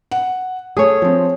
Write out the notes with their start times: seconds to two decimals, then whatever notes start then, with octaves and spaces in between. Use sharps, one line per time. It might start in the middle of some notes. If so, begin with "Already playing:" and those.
0.11 F#5
0.77 A3 G#4 C#5
1.02 F3 C4